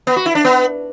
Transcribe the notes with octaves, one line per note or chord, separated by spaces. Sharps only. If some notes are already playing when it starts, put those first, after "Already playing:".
B3
F#4
E4
D4
B3